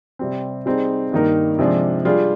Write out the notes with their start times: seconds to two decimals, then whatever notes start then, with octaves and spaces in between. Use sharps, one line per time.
0.19 C3 G3 C4
0.66 G3 C4 D#4 G#4
1.12 G2 D#3 A#3 D#4 A#4
1.58 C3 F3 G#3 D4 G#4
2.05 G3 D4 F4 G#4